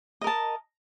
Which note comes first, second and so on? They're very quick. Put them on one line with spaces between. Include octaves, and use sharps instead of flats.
D#5 A#4 A5